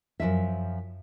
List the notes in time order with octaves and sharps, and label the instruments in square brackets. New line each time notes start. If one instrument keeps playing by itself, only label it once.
[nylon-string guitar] F#2 C3 F3 E5